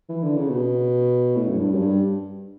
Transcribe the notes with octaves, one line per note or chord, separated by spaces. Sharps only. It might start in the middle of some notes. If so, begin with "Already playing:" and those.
E3
D3
C#3
B2
A2
F#2
G2
F#2
G2